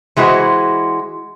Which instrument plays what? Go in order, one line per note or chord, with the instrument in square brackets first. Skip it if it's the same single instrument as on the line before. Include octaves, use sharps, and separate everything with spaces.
[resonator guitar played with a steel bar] E3 G#3 E4 F#4 C5